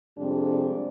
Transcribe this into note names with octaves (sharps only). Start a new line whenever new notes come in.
F2 C3 G3 G#3 C4 D4